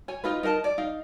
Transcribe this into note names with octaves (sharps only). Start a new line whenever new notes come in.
C#5 G#5
D#4 F4 B4
D#4 A#4 F5 A5
D5
D#4 F5